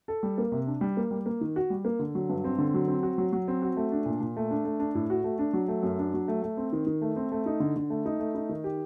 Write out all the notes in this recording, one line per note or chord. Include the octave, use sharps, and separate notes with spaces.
A4
G3
A#3
C3
D4
G3
A#3
G3
A#3
D#3
F#4
G3
A#3
D3
F#3
G2
C4
D3
F#3
C4
F#4
F#3
F#3
C4
F#4
A3
D4
A#2
A#2
A3
D4
A3
D4
A2
F#4
A3
D4
F#3
A3
F#2
D4
F#3
A3
A3
C4
D#3
D#3
A3
C4
A3
D#4
D3
D3
A3
D#4
A3
D#4
D#3
G4